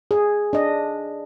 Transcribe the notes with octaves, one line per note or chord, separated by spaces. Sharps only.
G#4
D4 D#5